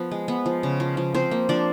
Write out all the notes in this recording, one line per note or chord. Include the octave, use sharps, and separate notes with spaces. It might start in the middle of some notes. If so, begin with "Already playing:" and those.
Already playing: F3 B3 B4
G#3
B3
F3
C#3
F3
F3
F3 C4 C5
A#3
F3 D4 D5